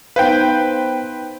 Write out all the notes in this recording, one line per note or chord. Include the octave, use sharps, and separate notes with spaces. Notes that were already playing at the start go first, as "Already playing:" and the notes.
B3 D#4 B4 C5 F5 G5